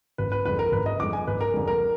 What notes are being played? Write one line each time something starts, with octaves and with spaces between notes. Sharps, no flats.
F#1 B4
B4
F2 D3 G#3 B4
A#4
F#1 B4
D#5
F2 D3 G#3 D6
G#5
F#1 B4
A#4
F2 D3 G#3
A#4